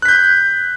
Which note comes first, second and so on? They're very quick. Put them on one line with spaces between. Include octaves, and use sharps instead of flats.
F#6 B6 G6